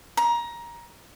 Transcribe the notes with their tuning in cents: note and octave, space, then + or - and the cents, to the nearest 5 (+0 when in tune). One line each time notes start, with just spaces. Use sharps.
A#5 +20